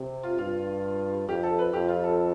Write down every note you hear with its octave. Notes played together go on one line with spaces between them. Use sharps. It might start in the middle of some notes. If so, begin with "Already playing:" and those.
Already playing: C3
F4
G2 F4
F2 G4
A4
B4
F2 G4
F4
A4